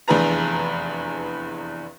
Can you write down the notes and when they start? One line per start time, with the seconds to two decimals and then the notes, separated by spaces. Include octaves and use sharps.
0.08 F1 E2 D4 G#4 B4 A#5